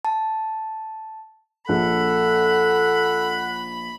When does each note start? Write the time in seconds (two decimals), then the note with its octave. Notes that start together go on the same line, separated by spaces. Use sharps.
0.05 A5
1.69 A#1 D4 G#4 A4 F#5 B5